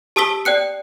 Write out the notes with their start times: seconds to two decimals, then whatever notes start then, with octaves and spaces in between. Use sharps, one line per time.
0.16 G4 A5 D#6 E6 B6 G7
0.45 D5 G5 F#6 C#7